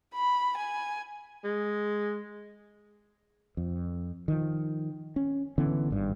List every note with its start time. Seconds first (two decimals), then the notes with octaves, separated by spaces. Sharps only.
0.14 B5
0.57 G#5
1.44 G#3
3.57 F2
4.28 D#3 F3
5.16 C#4
5.58 D3 E3 B3 C#4
5.90 G#1 G2